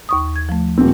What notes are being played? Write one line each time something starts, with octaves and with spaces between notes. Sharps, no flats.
D#2 C#6 D#6
G#6
F3 A3
D#1 C4